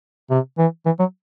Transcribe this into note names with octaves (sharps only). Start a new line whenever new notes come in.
C3
E3
E3
F#3